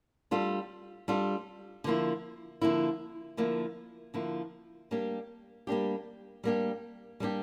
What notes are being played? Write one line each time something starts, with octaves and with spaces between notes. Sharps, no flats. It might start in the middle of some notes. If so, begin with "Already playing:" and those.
G3 D4 F4 A4
G3 D4 F4 A4
D3 F3 A#3 E4
D3 F3 A#3 E4
D3 F3 A#3 E4
D3 F3 A#3 E4
G3 A#3 D4 G4
G3 A#3 D4 G4
G3 A#3 D4 G4
G3 A#3 D4 G4